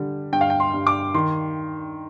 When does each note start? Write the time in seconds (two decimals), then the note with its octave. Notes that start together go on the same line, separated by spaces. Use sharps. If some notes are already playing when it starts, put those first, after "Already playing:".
Already playing: D3 G3
0.32 G2 G5
0.41 F5
0.50 G5
0.60 C6
0.73 G2
0.87 D6
1.14 D#3 C6